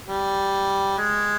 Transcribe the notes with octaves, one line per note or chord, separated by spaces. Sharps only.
G3
G#3